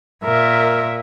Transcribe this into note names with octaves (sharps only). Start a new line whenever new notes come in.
A#2 A#4 E5